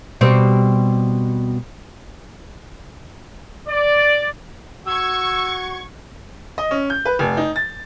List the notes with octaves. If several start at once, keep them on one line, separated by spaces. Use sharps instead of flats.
B2 G3 C4
D5
F#4 C#6 E6 G#6
D#5
C#4
G6
B4
F1
D#4
A6